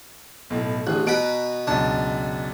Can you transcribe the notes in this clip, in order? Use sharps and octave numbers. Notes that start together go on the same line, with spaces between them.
B1 A2
A1 D3 G#4 F#6
B2 A#5 B5 F#6 D7
C#2 F#2 B2 D4